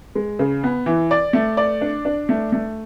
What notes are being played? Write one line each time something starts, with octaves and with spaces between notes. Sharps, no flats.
G#3
C#3
B3
E3
D5
A3
D5
D4
D4
A3
A3